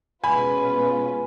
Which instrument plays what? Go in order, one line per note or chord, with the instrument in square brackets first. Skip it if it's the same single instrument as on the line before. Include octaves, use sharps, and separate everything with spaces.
[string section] B2 G#3 C#4 F4 B4 [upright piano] G#5 B5